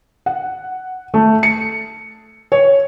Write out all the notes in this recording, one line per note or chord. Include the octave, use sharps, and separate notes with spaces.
F#5
A3
C#7
C#5